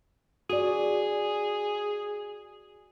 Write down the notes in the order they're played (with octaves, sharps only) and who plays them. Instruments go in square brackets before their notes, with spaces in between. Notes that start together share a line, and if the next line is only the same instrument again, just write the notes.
[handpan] F#4 D5 [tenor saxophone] G#4